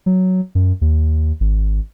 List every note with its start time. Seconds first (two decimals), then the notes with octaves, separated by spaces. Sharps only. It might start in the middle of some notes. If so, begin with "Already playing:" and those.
0.06 F#3
0.55 F#2
0.81 D#2
1.40 G#1